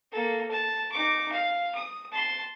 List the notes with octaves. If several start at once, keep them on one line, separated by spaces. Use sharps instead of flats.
A#3 A4
A5
D#4 D6
F5
D#6
A5 C6